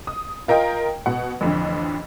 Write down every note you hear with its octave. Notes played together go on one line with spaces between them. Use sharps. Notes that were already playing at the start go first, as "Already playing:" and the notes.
D#6
F4 A#4 D#5 G5
B2 F#5
A1 F2 D3